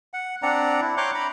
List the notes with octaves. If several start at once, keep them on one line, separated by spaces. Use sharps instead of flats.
F#5
C4 D4 D5 F#5 A#5
E4
C#5 A#5 C6 D6 F#6 G6
A#5 B5